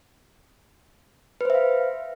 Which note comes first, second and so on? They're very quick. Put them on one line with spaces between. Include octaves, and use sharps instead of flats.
B4 C5 E5 F5